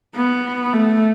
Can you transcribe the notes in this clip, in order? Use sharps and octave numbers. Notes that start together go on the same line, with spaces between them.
B3
A3